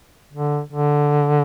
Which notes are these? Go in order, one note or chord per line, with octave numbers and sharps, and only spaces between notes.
D3
D3